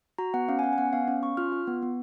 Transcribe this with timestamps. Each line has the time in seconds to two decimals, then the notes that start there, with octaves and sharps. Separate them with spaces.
0.18 F#4 A#5
0.34 B3 F#5
0.48 C#4 F5
0.59 G#5
0.63 C#4 F#5
0.73 G#5
0.78 B3 F#5
0.93 B3 F5
1.08 C#4 F5
1.23 C#4 C#6
1.37 F4 F6
1.52 F4
1.67 B3
1.82 B3